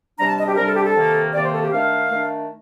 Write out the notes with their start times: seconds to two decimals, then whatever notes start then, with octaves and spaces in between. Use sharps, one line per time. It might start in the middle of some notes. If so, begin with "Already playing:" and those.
0.19 C3 G3 D4 A#5
0.28 A5
0.38 D#5
0.48 G4
0.57 C3 G3 D4 A#4
0.67 A4
0.76 G4
0.86 A4
0.96 C3 D#3 A#3
1.34 C3 D#3 A#3 D5
1.44 C5
1.53 A4
1.63 G4
1.73 D#3 A3 D4 F5
2.11 D#3 A3 D4